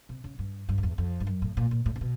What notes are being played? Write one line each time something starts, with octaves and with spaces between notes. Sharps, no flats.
C3
C#3
G2
G2
F2
E2
F2
G2
F#2
A2
A#2
A#2
A2
C3
B2